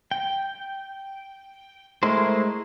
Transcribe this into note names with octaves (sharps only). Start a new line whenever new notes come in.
G5
G#3 A3 E4 A#4 C5